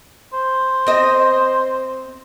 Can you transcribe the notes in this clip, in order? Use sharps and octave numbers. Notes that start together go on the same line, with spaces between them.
C5
C4 D#5